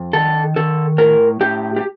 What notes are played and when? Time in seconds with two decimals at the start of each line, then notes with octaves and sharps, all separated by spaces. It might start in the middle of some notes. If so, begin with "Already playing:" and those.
Already playing: F2
0.13 D#3 A4
0.56 D#3 A4
0.98 A2 A#4
1.41 A2 G4
1.76 G4